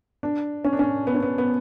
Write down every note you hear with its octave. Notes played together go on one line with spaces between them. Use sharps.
D4
C#4
D4
C#4
B3
C#4
B3
B3